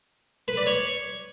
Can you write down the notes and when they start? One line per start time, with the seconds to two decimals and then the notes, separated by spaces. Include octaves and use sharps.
0.48 B4
0.57 D5
0.67 C#5